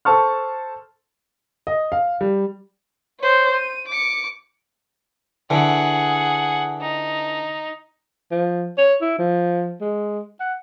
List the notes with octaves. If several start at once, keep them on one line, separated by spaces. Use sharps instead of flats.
A4 C5 A5 C#6 F6
D#5
F5
G3
C5 C#5
D#7
D6 C#7
D3 E3 G#4 F#5
D#4
F3
C#5
E4
F3
G#3
F#5